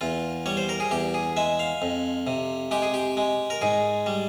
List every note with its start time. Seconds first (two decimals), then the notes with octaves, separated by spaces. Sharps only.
0.01 E2 F4
0.46 G3 C#5
0.57 C5
0.69 A#4
0.80 G#4
0.91 E2 G4
1.14 G#4
1.37 G#3 E5
1.59 F5
1.82 F2
2.27 C3
2.71 G#3 G4
2.82 G#4
2.94 G4
3.17 G#3
3.50 A#4
3.62 G#2 G#4
4.06 G3